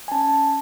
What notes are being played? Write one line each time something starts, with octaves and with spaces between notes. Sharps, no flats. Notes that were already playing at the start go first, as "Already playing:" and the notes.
G#5
C#4 A5